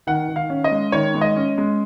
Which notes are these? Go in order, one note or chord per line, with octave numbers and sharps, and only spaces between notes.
D#3 F#5
D#3
F5
C#4
D#5
G#3
D#3 C#5
G#3
D#5
C#4
G#3